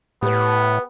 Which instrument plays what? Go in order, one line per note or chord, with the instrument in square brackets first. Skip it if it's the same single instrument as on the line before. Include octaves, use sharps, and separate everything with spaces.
[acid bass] A2 [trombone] B3 [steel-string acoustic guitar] G4 B4